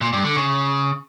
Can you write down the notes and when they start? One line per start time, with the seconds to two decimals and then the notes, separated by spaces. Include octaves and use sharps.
0.01 A#2
0.13 G2
0.24 D3
0.36 C#3